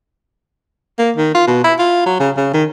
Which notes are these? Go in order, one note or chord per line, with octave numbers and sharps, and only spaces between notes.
A#3
D#3
F4
B2
E4
F4
F#3
C#3
C#3
D#3